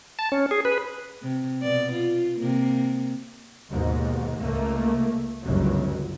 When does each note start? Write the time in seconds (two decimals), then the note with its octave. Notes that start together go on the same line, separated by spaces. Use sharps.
0.19 A5
0.32 C#4
0.51 G#4
0.65 B4
1.22 C3
1.62 B2 D5
1.93 F4
2.40 C3 A#3
3.69 D#2 G#2 B2
4.40 C#2 A3 A#3
5.43 G1 C#2 F#2 C#3 F#3